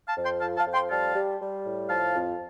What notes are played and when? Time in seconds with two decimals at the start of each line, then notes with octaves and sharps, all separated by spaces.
0.08 F5 A5
0.17 F2
0.25 G5 C6
0.41 F3 F5 A5
0.57 F5 A5
0.66 F2
0.74 G5 C6
0.90 G3 F5 A5
1.15 G3
1.40 G3
1.65 A2
1.89 F3 F5 A5
2.14 F2